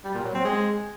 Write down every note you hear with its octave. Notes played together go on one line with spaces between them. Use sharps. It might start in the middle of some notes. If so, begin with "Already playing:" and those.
G3
A#2
F#3
C4
G#3